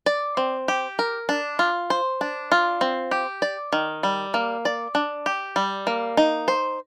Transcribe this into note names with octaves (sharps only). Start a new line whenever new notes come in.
D5
C4
G4
A#4
D4
F4
C5
D4
F4
C4
G4
D5
D#3
G3
A#3
D5
D4
G4
G3
A#3
D#4
C5